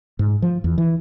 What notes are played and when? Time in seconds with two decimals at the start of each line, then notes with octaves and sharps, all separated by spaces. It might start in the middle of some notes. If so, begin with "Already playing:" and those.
0.19 G#2
0.42 F3
0.64 E2
0.78 E3